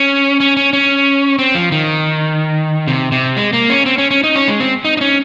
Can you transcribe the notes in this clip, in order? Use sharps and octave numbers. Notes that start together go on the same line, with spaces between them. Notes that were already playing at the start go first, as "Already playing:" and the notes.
Already playing: C#4
C#4
C#4
C#4
C4
F3
D#3
C3
C3
G#3
A#3
C#4
C4
C#4
C#4
D#4
C#4
G#3
C4
D#4
D#4
C#4